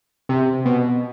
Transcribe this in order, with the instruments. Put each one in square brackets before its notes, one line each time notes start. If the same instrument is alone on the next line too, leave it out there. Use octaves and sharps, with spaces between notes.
[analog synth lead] C3
B2